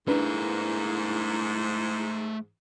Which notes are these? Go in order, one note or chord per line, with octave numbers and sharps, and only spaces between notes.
G#2 A3 D4 E4 A#4 B4